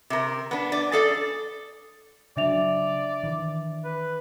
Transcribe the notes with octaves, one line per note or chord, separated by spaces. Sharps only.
C3 A#4
B3 D4
D5
G#4 A4 D5
C#3 F#3 D4 D5 E5 F7
D#3 E3
B4